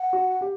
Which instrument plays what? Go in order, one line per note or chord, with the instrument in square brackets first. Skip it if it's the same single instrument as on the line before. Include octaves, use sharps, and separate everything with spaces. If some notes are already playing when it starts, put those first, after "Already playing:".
Already playing: [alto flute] F#5
[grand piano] F#4
G4